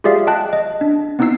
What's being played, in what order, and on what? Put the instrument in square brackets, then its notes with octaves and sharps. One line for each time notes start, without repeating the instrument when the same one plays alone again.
[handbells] F4 G4 G#4 D5 E5 F5
D#5 G5 A5 F#6
D#5
D4
B3 C4 D#4 E4 E6 C7